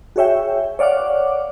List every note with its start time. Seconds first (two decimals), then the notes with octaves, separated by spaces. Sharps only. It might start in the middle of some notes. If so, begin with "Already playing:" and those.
0.16 F#4 G#4 C#5 E5 G5
0.79 C#5 D5 F5 F#5 D6